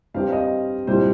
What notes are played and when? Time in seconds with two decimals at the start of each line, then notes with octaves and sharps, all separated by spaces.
0.14 G2 G3 C4 F5
0.32 D#5
0.87 C2 A#2 G3 C4 C5